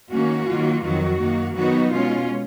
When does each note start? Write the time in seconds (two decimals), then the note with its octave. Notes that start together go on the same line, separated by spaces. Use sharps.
0.11 D#3 A#3 C#4 F#4
0.47 D#3 F#3 A#3 F4
0.83 F2 D#3 F#3 F#4
1.20 F#2 D#3 A#3
1.56 D#3 F#3 B3 D#4 F#4
1.91 B2 G#3 C#4 F4